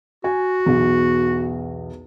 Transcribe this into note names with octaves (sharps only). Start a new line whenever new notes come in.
F#4 G#5
B1 E2